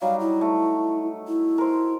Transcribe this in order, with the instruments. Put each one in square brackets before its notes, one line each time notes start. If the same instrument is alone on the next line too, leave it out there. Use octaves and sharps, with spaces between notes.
[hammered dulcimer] F#3 G3 D#4 [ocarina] F5
[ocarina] E4
[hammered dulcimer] A3
[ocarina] E4
[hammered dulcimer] A#4 C5